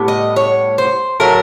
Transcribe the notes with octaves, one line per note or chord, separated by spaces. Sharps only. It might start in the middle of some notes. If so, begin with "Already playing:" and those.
Already playing: A2 G3 B3
D#5
C#5
C5
A2 F#3 A3 A#4